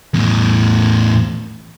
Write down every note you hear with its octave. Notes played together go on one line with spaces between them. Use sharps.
E2 A2